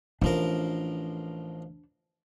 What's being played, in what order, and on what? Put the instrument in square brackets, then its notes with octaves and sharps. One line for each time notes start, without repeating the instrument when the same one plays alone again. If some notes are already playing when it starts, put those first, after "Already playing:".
[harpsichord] A1 F3 A#4 [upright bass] D4